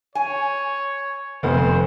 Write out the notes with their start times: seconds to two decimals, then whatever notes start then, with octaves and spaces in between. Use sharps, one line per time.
0.15 C#5 G#5
1.43 F1 B3 C5